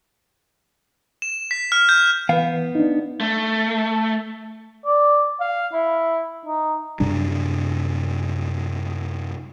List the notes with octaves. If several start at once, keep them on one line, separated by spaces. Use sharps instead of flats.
E7
B6
F6
G6
E3 B3 B4 F5
D4 D#4
A3
D5
F5
E4
D#4
F#2 C3 G3 D4